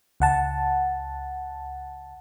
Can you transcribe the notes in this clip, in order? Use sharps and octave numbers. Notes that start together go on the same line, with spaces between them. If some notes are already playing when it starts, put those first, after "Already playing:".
C#2 F#5 A5